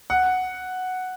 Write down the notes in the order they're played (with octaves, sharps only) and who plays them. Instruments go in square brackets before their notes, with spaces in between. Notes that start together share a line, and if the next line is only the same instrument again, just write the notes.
[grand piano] F#5